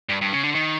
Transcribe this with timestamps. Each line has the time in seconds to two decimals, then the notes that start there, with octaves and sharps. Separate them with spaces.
0.09 G2
0.21 G2
0.33 C#3
0.44 D3
0.55 D#3